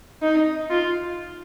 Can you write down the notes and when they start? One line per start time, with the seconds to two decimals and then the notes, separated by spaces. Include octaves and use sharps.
0.22 D#4
0.70 F4